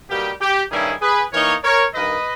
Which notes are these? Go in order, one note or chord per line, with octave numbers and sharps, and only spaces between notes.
B2 G3 A#3 D#4 G4
G4
G2 D#3 G3 C#4 E4 G#4
G#4 B4
E3 A#3 D#4 A#4 C#5
A#4 C#5
G2 D#3 A#3 B4 D#5